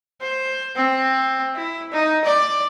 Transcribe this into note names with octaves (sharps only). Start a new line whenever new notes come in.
C5
C4
E4
D#4
D5